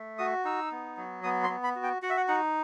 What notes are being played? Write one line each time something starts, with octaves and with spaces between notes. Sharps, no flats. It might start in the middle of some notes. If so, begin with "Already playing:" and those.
Already playing: A3
F#4 D#6
D#4 E6
B3
F#3
B3 D#6
C6
B3
B5
F#4
G5
F#4 F#5
E5
F#5
D#4 F#5